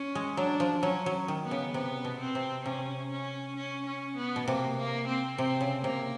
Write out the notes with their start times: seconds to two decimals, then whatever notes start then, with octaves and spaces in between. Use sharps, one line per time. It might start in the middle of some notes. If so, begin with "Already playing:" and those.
Already playing: C#4
0.15 G#3
0.37 F#3 D4
0.60 F3
0.83 F#3 C#4
1.06 F#3
1.28 D#3
1.45 B3
1.51 C#3
1.74 C3 B3
2.05 B2
2.20 C4
2.35 C3
2.65 C3 C#4
3.11 C#4
3.56 C#4
3.86 C#4
4.17 B3
4.36 B2
4.47 C3 A#3
4.77 A#3
5.08 C4
5.38 C3 C4
5.61 C#3
5.84 C3 A#3